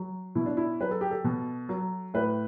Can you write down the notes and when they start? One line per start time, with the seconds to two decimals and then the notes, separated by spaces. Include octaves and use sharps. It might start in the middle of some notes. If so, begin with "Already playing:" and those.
Already playing: F#3
0.35 B2 E4
0.46 D4
0.57 E4
0.80 F#3 B4
0.91 A4
1.01 G4
1.11 A4
1.24 B2
1.69 F#3
2.14 A2 B4